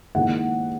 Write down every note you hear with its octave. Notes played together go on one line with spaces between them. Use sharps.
G#2 D#3 A#3 E4 F#5